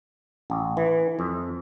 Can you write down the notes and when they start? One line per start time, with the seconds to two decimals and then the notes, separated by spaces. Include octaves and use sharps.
0.50 A1
0.77 E3
1.19 F2